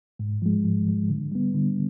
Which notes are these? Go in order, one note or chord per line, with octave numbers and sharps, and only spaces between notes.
G#2
F3 G#3
G#2
F3 G#3
D3
G3 B3
D3